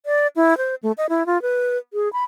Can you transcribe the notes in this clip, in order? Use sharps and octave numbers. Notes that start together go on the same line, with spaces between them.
D5
E4
C5
A3
D#5
E4
F4
B4
G#4
B5